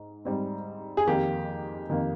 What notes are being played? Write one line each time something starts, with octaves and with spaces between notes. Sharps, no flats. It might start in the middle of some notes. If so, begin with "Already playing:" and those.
Already playing: G#2
G#2 G3 C4
G#4
F2 D#3 A#3 G4
F2 D#3 A#3